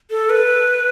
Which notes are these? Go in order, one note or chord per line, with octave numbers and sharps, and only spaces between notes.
A4
B4